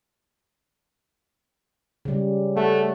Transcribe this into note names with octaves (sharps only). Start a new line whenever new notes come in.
C#3 G3
A3 G4 F#5